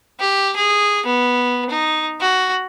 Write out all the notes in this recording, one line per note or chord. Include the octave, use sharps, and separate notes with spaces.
G4
G#4
B3
D#4
F#4